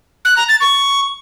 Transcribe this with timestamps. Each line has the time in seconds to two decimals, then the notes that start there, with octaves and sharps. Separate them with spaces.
0.25 F#6
0.37 A#5
0.49 A6
0.61 C#6